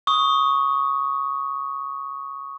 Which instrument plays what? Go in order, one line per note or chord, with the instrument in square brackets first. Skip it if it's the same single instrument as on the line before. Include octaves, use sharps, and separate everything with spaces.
[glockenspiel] C#6 D#6